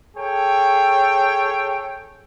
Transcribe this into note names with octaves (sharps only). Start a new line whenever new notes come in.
G#4 A4 C#5 G5